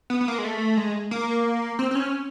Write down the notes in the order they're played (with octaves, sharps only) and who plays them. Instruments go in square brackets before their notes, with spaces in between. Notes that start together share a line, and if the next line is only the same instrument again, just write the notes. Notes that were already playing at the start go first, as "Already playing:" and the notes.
[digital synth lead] B3
B3
A#3
G#3
A3
G#3
A#3
C4
C4
C#4